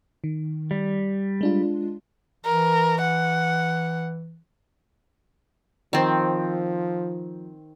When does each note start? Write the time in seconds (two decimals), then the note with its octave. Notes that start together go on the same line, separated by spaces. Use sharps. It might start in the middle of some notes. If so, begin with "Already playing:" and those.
0.24 D#3
0.71 G3
1.41 G#3 D4 F4
2.45 E3 A#4
3.01 F#5
5.93 D#3 F3 C4